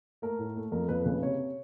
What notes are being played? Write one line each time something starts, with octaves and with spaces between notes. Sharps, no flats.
A3 A#4
A2
A3
F2 A#4
F2 B4
C#3 B4
C3 C#5